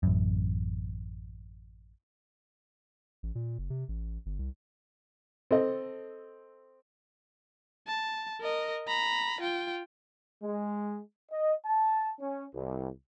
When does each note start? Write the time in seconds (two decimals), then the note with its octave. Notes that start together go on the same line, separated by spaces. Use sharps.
0.03 A1 F#2
3.23 A1
3.35 A#2
3.58 F#1
3.70 C3
3.89 A1
4.26 G1
4.39 C2
5.51 C4 A4 D#5
7.88 A5
8.41 A#4 D#5
8.88 A#5 B5
9.41 F4 G5
10.43 G#3
11.32 D#5
11.66 A5
12.20 C#4
12.54 C2